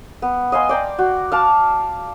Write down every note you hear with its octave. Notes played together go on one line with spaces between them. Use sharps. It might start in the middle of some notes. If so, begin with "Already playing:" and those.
B3
D#5 F5 G#5 C6
D5 G5 A#5
F#4
F5 A5 D6